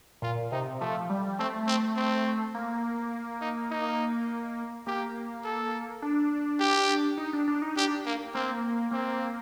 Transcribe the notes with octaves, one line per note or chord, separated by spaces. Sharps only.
A#2 F4
C3 D#4
F3 A3
G3
A3 C4
C4
C4
A#3
D#4
D#4
A#3 G4
A4
D4
G4
D#4
D4
D4
D#4
D4 G4
A#3
A#3 C4
A#3 C4